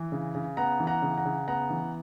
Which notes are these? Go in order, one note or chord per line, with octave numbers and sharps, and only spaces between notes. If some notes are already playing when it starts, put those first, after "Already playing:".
Already playing: E3
C#3
C#3
B3 F#5 A#5
E3
F#5 A#5
C#3
F#5 A#5
C#3
B3 F#5 A#5
E3